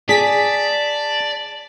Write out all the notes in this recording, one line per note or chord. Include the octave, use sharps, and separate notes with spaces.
G#4 D5 A5 B6